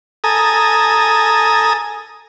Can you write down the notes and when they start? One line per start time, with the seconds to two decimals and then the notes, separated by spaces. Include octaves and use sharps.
0.24 A4 G#5 A#5 D#6